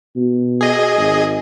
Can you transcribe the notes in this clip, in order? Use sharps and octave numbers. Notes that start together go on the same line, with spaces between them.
B2
G#4 D#5
G#1